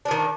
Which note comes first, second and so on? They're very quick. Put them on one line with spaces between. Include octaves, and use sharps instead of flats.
D4 F3 D#3